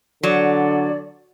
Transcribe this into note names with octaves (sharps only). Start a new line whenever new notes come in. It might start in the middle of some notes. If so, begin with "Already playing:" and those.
D3 F#3 D5